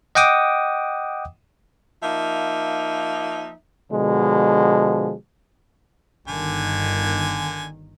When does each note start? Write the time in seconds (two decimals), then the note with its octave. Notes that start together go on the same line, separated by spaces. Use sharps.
0.15 D#5 F#5 G5 D6 D#6
2.03 F3 A#3 D#4 E5
3.90 B2 D3 F3 G#3
6.28 G1 D3 D#3 G#5